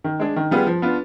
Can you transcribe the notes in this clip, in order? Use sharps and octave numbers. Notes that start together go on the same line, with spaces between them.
D#3
G#3 D4 G#4
D#3
G3 B3 F4 G#4
F3
B3 D4 F4